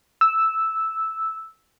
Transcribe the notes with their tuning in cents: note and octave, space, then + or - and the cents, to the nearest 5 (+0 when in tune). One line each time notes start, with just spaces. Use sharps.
E6 -5